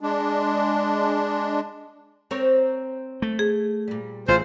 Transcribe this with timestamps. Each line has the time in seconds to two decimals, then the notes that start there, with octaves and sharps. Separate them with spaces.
0.01 G#3 D4
2.31 C4 A#4 C#5
3.22 A3
3.39 G#4
3.88 A#2 G3
4.28 A1 F4 G#4 C5